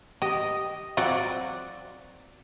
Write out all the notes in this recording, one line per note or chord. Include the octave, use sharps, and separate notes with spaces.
G4 D#5
F#3 C4 F4 F#4 D5 F#5